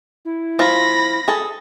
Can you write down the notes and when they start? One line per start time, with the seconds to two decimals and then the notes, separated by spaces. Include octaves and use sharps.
0.25 E4
0.59 F3 F4 B5 A#6
1.28 G#4 A4